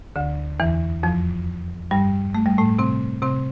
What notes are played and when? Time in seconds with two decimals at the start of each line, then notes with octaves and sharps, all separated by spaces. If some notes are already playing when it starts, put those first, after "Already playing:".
0.16 D2 D3
0.60 E2 E3
1.03 F2 F3
1.91 G2 G3
2.35 A3
2.46 G3
2.58 A2 A3
2.79 C3 C4
3.22 C3 C4